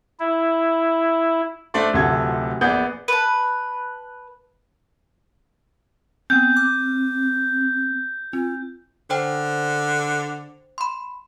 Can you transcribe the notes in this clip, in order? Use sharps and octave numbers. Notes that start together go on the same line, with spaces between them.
E4
A3 D4 C5 D5 C6
D1 D2 C3 F4 A4 G#6
A#1 B3 G#4 D5 G6
B4 A5
B3 C4 G6
C4 D6 F6
C4 F4
D3 C5 G5
B5 C6